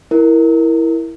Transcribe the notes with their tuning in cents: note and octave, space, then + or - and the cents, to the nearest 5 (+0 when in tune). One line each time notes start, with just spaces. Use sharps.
E4 +0 A#4 +0